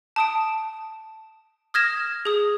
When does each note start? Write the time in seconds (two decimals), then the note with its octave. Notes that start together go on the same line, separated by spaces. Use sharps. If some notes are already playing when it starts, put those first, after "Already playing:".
0.16 A5 D#6 D7
1.74 D#6 F6 G#6 A#6 E7
2.25 G#4 D#6